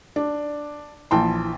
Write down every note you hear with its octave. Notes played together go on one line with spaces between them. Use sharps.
D4
A#1 E3 G5 A5 C6